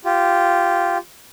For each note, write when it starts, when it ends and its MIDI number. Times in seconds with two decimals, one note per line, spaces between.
0.05 0.98 65
0.05 0.98 67